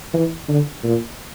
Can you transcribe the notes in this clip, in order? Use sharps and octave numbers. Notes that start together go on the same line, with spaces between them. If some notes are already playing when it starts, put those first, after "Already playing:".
E3
D3
A#2